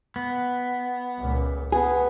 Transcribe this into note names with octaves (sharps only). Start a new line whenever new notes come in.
B3
C#2 A#2
B3 G#4